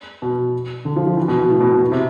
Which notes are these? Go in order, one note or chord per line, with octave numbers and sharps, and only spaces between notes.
B2
D3
F3
F3
E3
B2
B2
A2
B2
B2
B2
C3